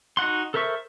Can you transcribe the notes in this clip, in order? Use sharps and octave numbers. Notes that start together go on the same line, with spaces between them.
D#4 F#4 F#5 C6
A4 A#4 C5 E5 C#6